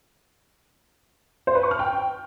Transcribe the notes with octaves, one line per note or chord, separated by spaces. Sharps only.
C5
B4
C#6
F6
G5